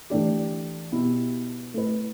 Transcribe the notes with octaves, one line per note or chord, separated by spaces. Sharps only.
E3 A3 D4 G4
B2 B3 E4 G4
A3 E4 B4